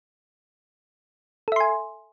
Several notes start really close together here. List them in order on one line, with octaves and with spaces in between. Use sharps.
A4 E5 C6 G#5